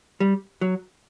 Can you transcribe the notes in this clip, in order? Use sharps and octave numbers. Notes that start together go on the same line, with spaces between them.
G3
F#3